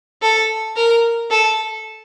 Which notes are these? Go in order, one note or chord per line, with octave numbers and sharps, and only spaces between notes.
A4
A#4
A4